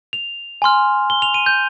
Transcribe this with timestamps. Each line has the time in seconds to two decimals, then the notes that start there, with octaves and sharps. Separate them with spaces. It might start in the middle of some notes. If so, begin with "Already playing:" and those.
0.13 F7
0.62 G#5 C6 F6
1.10 G7
1.22 F7
1.34 D#7
1.46 G6